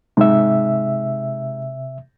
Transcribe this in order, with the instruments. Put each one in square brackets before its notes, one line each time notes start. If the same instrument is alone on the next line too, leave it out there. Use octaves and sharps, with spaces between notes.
[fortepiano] G#2 [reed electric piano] C3 E5